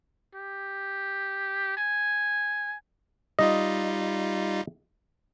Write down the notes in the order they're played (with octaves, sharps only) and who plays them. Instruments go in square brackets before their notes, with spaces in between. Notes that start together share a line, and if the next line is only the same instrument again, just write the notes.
[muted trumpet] G4
G#5
[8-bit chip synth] G3 D#4 F4 [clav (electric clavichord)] D#5